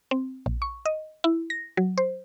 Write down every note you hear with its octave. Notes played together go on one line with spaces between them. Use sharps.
C4
A#1
C#6
D#5
E4
A#6
F#3
C5